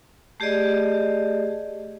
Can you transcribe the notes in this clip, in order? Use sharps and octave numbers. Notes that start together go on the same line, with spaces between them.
A3 G4 G#4 D5 D#5